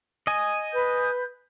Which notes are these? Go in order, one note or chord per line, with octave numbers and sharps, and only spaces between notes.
D#5 G#5
B4 G6